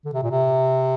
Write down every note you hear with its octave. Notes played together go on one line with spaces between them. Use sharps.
D3
C3
A#2
C3